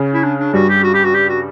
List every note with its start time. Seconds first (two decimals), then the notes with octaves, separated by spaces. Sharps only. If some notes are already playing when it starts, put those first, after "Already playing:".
Already playing: C#3 C#4
0.13 E4
0.23 D4
0.39 D4
0.53 G2 G3 F#4
0.69 G4
0.84 F#4
0.94 G4
1.04 F#4
1.14 G4
1.29 F#4